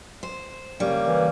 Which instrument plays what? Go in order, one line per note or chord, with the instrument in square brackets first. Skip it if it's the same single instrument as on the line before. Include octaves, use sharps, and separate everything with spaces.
[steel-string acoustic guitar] C5
[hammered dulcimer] C#3 D5 [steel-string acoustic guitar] G3 [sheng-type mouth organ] A#3
[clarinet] E3